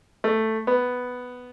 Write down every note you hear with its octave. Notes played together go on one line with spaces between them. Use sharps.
A3
B3